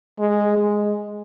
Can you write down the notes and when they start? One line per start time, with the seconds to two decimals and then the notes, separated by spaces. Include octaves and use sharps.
0.19 G#3
0.58 G#3